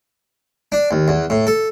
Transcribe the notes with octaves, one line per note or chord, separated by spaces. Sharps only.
D4
D#2
E2
A2
A4